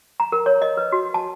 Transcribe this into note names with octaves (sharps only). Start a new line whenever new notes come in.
A#5
A#4
C#5
D#5
B4
F#4
A5